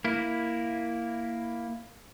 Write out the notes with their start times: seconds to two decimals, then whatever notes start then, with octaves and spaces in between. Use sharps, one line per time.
0.05 A#3 E4